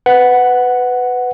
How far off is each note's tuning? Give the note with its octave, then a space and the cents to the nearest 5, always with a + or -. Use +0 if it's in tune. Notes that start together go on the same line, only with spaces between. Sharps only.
B4 +20 F#5 +0